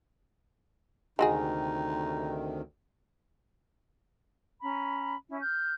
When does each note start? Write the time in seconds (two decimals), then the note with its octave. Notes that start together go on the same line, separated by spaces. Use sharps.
1.19 D2 C3 D#3 G#3 D#4 F#4 G#4
4.61 C#4 A#5 B5
5.27 C#4 E4
5.41 F6 G6